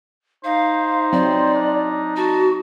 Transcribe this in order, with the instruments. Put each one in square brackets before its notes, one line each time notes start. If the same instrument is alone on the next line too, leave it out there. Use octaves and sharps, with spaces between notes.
[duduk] D#4 [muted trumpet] C5 [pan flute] F5
[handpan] F#3 C4 [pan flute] D5
[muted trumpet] D4
[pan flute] F#4 [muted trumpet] A5